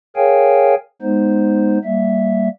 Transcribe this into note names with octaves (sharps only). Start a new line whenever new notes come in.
G#4 A#4 C#5 F5 G5 G#5
G#3 B3 D#4 C5
G3 A#3 E5